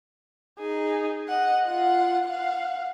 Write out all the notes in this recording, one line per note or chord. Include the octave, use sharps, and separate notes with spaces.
D#4 G#4
D#5 F#5
F4 F#5
F5 F#5